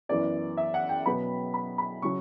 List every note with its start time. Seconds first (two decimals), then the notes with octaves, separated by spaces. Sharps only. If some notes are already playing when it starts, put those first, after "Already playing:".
0.09 F#2 E3 B3 D5
0.57 E5
0.74 F#5
0.89 G5
1.06 B2 F#3 B3 B5
1.54 B5
1.78 B5
2.02 C#3 F#3 C#6